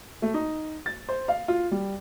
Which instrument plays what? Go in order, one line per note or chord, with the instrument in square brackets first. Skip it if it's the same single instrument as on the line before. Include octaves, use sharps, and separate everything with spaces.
[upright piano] A3
D#4
A6
C5
F5
F4
G3